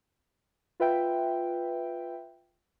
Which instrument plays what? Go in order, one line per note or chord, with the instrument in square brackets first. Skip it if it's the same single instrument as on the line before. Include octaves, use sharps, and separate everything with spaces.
[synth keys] F4 B4 E5 G5